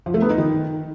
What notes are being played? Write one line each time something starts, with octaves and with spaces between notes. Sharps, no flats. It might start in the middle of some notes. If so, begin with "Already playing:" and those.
F3
A3
B3
D#4
D#3